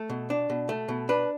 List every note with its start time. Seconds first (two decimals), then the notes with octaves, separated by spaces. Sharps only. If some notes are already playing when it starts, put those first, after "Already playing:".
Already playing: A3
0.10 B2
0.30 D4
0.50 B2
0.69 A3
0.89 B2
1.09 D4 B4